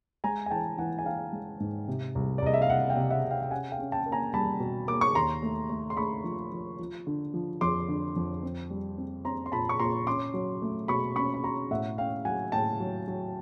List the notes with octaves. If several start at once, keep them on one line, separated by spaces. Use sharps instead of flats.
G#3 G#5 A#5
G#5
E3 G5 A5
E3 F#5 G#5
G#5
E3 F5 G5
G#3
G#2
C3
C2
D5
C2 D#5
E5
F5
C2 E5 F#5
F5 G5
C3
E5 F#5
C3
F5 G5
G5
C#4 F#5 G#5
F5 G5
C#4
G5 A5
A#3
G#5 A#5
G3 A5 B5
B2
A#3 D6
C#6
D#2 A#5 C6
A3
A3
C6
A3 B5 C#6
F3
F3
F3
D3
F3
F2 C6 D6
D3
F2
C4
G3
C4
C4 A#5 C6
C6
A#2 A5 B5
C#6
A#2 A#5 C6
C#4 C6 D6
F#3
A3
B2 B5 C#6
C#4 B5 C#6
B5
B2 A#5 C6
A2 E5 F#5
C#4 F5 G5
F#3 F#5 G#5
A2 G5 A5
F#3
F#3